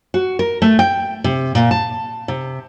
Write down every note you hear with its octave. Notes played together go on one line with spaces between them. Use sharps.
F#4
A#4
A3
G5
C3
A#2
A5
C3